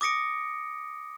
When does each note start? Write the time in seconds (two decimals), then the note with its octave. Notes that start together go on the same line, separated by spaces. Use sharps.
0.01 D6 D#6 A#6 C#7 D7